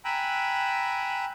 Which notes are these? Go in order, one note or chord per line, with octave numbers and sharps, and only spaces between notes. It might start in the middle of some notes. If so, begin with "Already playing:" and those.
G5 G#5 A#5 B5 E6 F#6